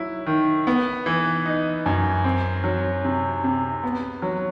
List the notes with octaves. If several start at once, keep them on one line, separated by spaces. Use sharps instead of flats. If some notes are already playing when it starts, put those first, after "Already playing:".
Already playing: F#3 E4
D#3
B3
E3
D#4
F#2
C4
F#3
C3
C3
B3
F#3